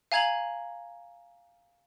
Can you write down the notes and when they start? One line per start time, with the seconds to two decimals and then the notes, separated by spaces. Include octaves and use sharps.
0.12 F5 G#5 A#5 G#6 F7 F#7